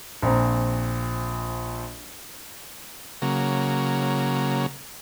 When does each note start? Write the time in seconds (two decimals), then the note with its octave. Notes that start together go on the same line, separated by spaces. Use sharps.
0.22 A#1 A#2 C4 A#5
3.22 C#3 F#3 A#3